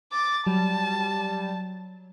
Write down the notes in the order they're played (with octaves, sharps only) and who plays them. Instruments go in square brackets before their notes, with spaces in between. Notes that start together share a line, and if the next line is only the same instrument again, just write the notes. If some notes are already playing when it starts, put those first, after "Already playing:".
[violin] D6 A6
[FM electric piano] F#3 [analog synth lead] G3 [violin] A5